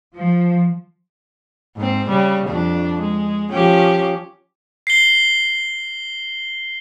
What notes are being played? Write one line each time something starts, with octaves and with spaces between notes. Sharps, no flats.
F3
G#2 C4
C#3 G3
F2 D4
G#3
F3 C#4 G4
C7 G7